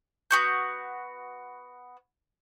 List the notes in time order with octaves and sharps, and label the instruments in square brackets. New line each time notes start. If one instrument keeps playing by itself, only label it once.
[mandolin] B3 F#4 G6